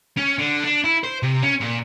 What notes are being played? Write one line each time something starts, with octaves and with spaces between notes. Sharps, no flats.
C#4
D3
D4
E4
C5
C3
C#4
A#2